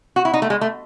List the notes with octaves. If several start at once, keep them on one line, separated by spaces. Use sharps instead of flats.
F#4
E4
D#4
A3
G#3
A3